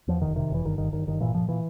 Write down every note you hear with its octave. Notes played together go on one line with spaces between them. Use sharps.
E2 F3
F1 D#3
C3 D#3
F1 E3
G1 D#3
G1 D#3
G1 D#3
G1 D#3
A#2 E3
A#2 F3
A#2 E3